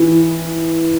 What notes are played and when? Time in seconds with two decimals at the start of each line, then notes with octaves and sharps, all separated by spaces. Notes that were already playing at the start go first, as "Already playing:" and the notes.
Already playing: E3